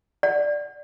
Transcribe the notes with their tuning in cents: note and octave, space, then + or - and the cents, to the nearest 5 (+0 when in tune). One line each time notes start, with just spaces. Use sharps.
D5 +0 F#5 +0